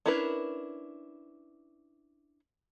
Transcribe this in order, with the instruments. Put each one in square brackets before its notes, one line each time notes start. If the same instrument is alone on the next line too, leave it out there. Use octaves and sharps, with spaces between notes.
[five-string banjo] C#4 D4 E4 A#4 B4